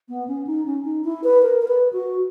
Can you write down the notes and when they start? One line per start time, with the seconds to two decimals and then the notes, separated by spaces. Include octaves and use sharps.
0.09 B3
0.28 C#4
0.47 D#4
0.66 C#4
0.85 D#4
1.04 E4
1.24 B4
1.43 A#4
1.62 A#4
1.68 B4
1.93 F#4